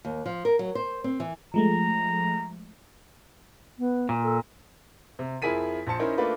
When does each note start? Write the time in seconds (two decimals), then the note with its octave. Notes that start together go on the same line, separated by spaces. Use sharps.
0.05 D#2
0.26 F3
0.45 A#4
0.59 F#3
0.75 C5
1.04 C4
1.20 E3
1.54 F3 G#3 A3 A#5
3.78 B3
4.09 A#2
4.24 A4
5.19 C3
5.42 F2 E4 G#4 A#4 B6 D#7
5.87 A#1 C5 A5 C#7
5.99 C#4 D#4 E4 A#4 C5 D#5
6.18 A3 A#3 D4 F4 B4